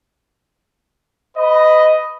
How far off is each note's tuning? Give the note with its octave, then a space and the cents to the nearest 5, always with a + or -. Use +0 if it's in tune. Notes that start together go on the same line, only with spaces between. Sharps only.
B4 +35 D#5 +0 B5 +0